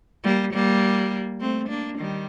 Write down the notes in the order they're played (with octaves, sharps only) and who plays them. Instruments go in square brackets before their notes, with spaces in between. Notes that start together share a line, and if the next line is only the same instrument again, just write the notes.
[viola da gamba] G3 A#3
G3 A#3
A3 C4
A#3 D4
D#3 G3